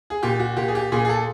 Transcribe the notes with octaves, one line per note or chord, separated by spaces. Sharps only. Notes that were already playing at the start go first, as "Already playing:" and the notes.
G#4
A#2 G4
F#4
A#2 G4
G#4
G4
A#2 G#4
G#4
A4